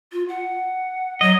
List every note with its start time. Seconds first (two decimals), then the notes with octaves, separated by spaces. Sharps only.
0.12 F4
0.29 F#5
1.21 F#3 D#5